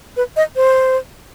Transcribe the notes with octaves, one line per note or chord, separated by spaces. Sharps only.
B4
D#5
C5